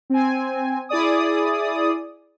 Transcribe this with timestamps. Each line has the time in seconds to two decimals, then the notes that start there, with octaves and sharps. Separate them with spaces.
0.10 C4 G#5
0.89 E4 G#4 D5 D#6